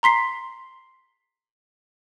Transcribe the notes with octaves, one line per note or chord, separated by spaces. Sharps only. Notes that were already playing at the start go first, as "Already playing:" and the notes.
A#5 C6 B6 C7